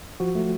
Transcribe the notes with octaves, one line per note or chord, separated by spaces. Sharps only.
F3 F#4
A3